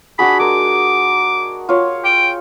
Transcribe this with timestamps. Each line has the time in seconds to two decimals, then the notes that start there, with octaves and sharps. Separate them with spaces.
0.19 D4 F#4 G#4 B5
0.40 G#3 A#4 D6
1.69 F4 C#5
2.05 G5